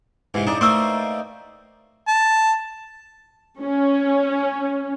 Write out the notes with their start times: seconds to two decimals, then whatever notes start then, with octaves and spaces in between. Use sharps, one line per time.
0.34 G#2 C3 E3
0.47 C#3 D4 D#4 D5
0.61 A3 A#3 C4 C#6 E6
2.08 A5
3.61 C#4